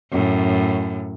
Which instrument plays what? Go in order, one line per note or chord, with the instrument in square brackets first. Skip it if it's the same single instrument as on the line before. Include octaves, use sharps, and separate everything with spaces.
[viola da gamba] F#2 A2